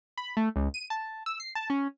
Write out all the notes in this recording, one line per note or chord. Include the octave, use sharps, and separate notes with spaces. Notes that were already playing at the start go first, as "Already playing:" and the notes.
B5
A3
C#2
D#7
A5
E6
C7
A5
C#4